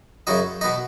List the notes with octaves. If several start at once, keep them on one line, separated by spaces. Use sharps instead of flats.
F#2 C#3 F#3 D#4 D#5
B2 B3 D#4 D#5